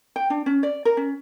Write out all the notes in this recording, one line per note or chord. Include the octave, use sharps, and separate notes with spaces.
G5
D4
C#4
D5
A#4
C#4